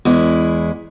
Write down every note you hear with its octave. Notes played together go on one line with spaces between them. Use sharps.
E2 G#3 E4